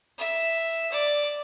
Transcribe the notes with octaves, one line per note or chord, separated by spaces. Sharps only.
E5
D5